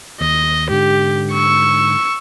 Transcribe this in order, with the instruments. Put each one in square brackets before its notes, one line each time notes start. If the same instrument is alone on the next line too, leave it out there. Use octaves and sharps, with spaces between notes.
[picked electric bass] D#2 [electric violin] D#5
[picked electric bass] G#2 D3 [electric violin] G4
[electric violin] C#6 E6